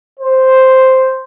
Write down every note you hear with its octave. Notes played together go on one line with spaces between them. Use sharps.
C5